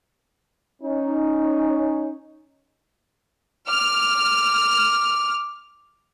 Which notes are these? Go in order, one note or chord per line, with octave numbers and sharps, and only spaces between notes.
C#4 D#4
D6 F6